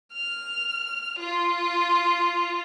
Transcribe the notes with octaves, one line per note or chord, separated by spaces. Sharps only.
F6
F4